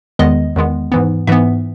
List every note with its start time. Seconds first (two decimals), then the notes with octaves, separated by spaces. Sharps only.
0.19 E2 D#3 G#3 B3 D#5
0.56 E2 D#3 G#3 B3
0.92 G#2 E3 B3
1.27 G#2 E3 B3 E5